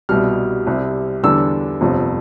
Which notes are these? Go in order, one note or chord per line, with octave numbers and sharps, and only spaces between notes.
C2 B2 G3 F6
C2 C3 G3
E2 D3 G3 D4 E6
G1 F2 C3